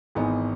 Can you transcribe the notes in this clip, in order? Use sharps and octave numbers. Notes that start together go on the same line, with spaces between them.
G#1 G#2 E3 B3 D#4